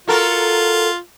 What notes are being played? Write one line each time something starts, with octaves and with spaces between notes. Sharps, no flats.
F4 F#4 A4 A#4